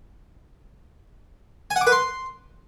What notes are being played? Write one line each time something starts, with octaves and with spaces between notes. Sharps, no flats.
G#5
F#5
D6
B4
C6